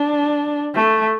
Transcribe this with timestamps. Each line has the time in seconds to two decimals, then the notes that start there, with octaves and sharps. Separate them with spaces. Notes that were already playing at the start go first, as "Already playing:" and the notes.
Already playing: D4
0.75 A3